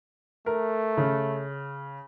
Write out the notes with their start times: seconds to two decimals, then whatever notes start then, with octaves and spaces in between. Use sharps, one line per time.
0.46 A3 A#4
0.97 C#3